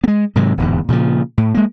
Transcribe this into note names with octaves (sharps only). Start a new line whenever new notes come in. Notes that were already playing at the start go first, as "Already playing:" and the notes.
G#3 B3
G#2 C3 D#3 F#3
D1 E2 G#2
A#2 C#3 E3 F3
A2
G#3 A#3